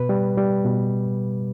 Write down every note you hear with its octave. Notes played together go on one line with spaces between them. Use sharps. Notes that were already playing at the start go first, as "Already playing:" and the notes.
Already playing: B2 B4
G3
G3
B2